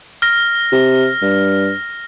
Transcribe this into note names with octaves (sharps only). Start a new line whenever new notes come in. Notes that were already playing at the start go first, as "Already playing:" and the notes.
F6 A#6
C3
G2